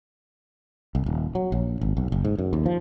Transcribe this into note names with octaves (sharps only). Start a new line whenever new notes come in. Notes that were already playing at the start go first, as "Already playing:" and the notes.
C2
D#1
F#3
A#1
G#1
B1
F#1
G#2
F#2
D#2
F3